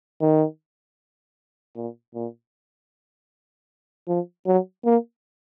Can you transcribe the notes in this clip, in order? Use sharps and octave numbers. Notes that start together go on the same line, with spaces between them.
D#3
A#2
A#2
F3
F#3
A#3